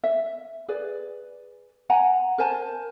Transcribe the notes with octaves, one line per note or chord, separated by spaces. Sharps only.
E5
G#4 B4 D5
F#5 G#5 A#5
A#4 C5 G#5 A5